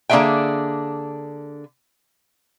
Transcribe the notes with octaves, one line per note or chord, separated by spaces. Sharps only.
D3 A#3 D4 G#4 E5 G5